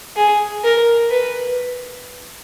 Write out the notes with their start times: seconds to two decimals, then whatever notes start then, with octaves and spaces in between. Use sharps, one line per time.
0.17 G#4
0.64 A#4
1.11 B4